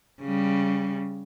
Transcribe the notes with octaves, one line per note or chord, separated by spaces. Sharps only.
C#3 G3